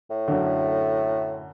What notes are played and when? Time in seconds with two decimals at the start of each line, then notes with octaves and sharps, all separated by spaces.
0.10 A2
0.28 F#2 D3